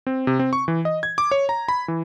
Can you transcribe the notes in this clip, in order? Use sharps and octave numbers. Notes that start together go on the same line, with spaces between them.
C4
C3
C4
C#6
E3
D#5
G#6
D6
C#5
A#5
B5
E3